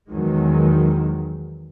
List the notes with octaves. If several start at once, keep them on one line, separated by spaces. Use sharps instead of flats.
E2 D#3 F#3 G#3